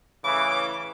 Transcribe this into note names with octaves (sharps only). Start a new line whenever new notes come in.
A2 C#3 E3 D6